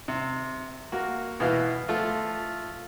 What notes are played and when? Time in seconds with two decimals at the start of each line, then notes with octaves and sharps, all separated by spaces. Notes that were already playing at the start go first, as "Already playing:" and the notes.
0.08 C3
0.92 A#3 F#4
1.40 B2 E3 E4 F#4 F5
1.88 F3 A3 F4